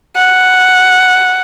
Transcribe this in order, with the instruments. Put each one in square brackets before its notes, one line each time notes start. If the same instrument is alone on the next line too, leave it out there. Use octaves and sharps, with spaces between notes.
[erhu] F#5